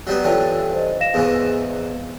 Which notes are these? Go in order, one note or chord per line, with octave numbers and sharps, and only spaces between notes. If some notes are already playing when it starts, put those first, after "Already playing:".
F#3 G3 B3
G2 D3 E3 F4 C#5 G5
C5 D#5
F5 A#6 E7
E2 G#2 E3 B4 F5